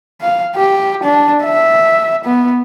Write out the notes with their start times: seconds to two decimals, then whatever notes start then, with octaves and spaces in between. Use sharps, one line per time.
0.21 F5
0.55 G4
1.03 D4
1.43 E5
2.24 B3